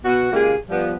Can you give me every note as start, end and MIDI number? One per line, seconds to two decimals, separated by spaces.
0.04 0.30 47
0.04 0.30 66
0.32 0.55 46
0.32 0.55 49
0.32 0.55 56
0.32 0.55 58
0.32 0.55 67
0.32 0.55 68
0.70 0.95 53
0.70 0.95 55
0.70 0.95 59